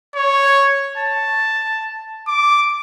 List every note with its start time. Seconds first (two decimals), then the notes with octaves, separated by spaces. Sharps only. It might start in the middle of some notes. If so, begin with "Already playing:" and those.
0.16 C#5
0.98 A5
2.28 D6